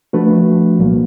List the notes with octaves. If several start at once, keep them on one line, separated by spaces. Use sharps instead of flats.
F3 A3 D4 F#4 B4
C2 A#2 F#3 A#3